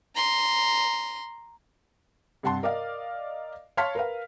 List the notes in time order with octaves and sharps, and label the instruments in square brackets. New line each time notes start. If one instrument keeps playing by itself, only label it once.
[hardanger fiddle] A#5 C6
[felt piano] G2 C3 F#5 A5 C6
A#4 D5 D#5 F5
C#5 F5 A5 C6 F6 B6
A#4 B4 F5